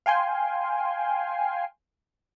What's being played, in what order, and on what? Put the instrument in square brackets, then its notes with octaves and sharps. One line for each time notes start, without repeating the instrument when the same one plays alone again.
[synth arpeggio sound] F5 G5 G#5 C6